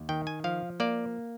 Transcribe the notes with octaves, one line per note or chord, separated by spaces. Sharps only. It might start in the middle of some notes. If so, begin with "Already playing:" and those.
Already playing: D#2
D#3 G5
G#5
F3 F5
A#3 D5